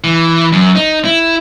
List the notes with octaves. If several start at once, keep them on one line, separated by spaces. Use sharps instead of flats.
E3
F#2
D#4
E4